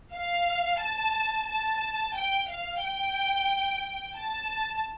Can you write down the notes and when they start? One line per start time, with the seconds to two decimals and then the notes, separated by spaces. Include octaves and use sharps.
0.14 F5
0.81 A5
1.48 A5
2.16 G5
2.50 F5
2.83 G5
4.17 A5